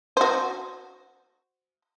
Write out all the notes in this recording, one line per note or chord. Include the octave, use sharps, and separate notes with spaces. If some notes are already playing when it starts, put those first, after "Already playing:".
F#4 C5